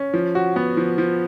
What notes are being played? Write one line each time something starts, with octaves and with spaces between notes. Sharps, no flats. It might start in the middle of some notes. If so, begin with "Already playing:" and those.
Already playing: C#4
F3
F#4
B3
F3
F3